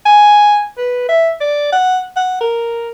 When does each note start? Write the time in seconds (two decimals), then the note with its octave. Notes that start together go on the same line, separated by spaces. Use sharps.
0.06 G#5
0.78 B4
1.09 E5
1.41 D5
1.73 F#5
2.16 F#5
2.41 A#4